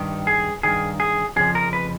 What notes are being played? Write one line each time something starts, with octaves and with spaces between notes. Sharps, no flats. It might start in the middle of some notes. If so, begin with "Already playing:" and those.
Already playing: G2 D#3
G#4
G2 D#3 G#4
G#4
F2 C#3 F3 G#4
A#4
B4